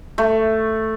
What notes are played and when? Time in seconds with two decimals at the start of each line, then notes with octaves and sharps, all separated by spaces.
0.18 A3